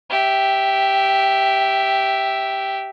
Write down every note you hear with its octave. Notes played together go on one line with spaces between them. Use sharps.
G4 E5